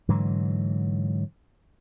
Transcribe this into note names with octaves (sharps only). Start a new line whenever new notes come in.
G#2 D3 E3 F#3